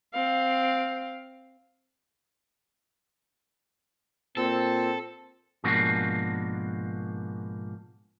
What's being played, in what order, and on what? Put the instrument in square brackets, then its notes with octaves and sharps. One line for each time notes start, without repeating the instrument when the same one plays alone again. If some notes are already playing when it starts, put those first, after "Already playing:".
[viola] C4 F5
[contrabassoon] A#2 [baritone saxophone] C4 [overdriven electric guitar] A4
[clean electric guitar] G#2 B2 F3 A#3 D4 F#4